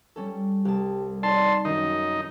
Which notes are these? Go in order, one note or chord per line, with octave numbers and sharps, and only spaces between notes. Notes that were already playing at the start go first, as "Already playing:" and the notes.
G3 C#4 A4
C2 G4 A5
D#4 C#5 D5 A5 C6
F#2 D#3 D#4